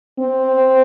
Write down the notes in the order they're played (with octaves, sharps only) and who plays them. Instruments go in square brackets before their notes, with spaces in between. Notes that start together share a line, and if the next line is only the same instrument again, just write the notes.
[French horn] C4